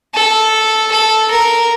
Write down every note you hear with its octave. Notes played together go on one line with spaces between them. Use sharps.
A4
A4
A#4